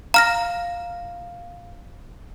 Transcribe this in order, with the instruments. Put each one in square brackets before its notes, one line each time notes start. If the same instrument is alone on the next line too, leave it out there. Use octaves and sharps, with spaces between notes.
[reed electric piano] F5 [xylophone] A#5 F6 A#6